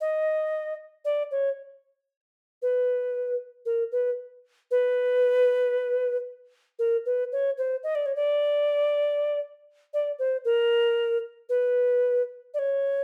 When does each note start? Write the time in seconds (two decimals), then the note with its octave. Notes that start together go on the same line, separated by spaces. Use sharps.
0.01 D#5
1.05 D5
1.31 C#5
2.62 B4
3.65 A#4
3.92 B4
4.71 B4
6.79 A#4
7.06 B4
7.32 C#5
7.58 C5
7.83 D#5
7.95 D5
8.06 C#5
8.15 D5
9.93 D5
10.19 C5
10.45 A#4
11.49 B4
12.54 D5
12.59 C#5